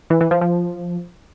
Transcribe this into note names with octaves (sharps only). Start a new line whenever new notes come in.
E3
E3
F3
F3